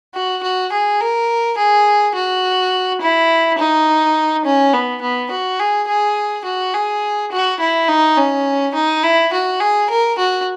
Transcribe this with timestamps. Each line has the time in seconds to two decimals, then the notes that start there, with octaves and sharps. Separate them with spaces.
0.15 F#4
0.43 F#4
0.72 G#4
1.01 A#4
1.58 G#4
2.15 F#4
3.01 E4
3.59 D#4
4.45 C#4
4.73 B3
5.02 B3
5.31 F#4
5.60 G#4
5.88 G#4
6.45 F#4
6.74 G#4
7.32 F#4
7.60 E4
7.89 D#4
8.18 C#4
8.75 D#4
9.03 E4
9.33 F#4
9.60 G#4
9.90 A#4
10.18 F#4